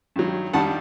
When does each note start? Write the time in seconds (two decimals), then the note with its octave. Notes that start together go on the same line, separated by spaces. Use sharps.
0.16 G2 D#3 F#3
0.53 G2 D#3 G3 F#5 A5